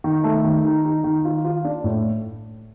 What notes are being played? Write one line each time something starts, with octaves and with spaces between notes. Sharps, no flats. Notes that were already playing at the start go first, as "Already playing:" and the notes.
D#3
A3
D#3
D#4
D#4
D#3
F4
F4
D4
A2